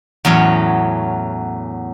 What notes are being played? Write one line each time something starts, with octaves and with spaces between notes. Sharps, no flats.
E2 A2 F#3 C#4